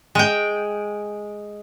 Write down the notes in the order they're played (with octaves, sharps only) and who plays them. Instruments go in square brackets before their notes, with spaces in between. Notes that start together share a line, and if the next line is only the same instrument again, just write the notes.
[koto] G#3 G5